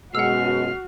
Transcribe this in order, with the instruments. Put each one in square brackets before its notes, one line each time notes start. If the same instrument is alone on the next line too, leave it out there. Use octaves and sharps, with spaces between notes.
[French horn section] F#2 B2 G#3 [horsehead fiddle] F#4 [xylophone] F#5 E6 [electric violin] F6 C7